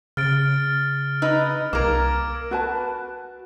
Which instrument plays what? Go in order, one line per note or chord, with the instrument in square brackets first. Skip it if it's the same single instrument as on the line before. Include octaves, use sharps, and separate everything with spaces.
[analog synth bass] C#3 [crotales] F6 A6 D7
[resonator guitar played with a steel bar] D#4 B4 [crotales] E6
[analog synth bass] C2 [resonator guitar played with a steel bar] A#3 A#4 [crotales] D6 G#6 D7
[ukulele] F#4 B4 A5